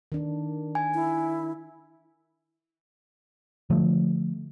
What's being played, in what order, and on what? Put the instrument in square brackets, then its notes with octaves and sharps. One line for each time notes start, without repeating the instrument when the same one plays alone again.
[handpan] D#3 D4
[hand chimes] G#5
[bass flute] E4
[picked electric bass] D3 F3 A3